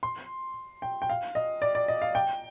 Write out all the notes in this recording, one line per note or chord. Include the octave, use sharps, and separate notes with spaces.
C6
G5
G5
F5
D#5
D5
D5
D#5
F5
G5